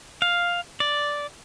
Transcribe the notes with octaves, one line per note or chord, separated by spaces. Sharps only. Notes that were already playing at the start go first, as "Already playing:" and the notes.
F5
D5